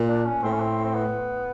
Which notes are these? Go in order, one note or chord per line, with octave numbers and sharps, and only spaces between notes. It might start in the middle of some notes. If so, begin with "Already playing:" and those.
Already playing: A#2
D4
C#4
A2 C4
C#4
C4
C4
B3